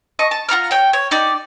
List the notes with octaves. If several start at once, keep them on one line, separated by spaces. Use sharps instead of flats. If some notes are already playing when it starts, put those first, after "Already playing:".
D#5 A5 C#6
A5
F4 F#5 A#5 F6
C#5 G5
C#5
D#4 G4 D5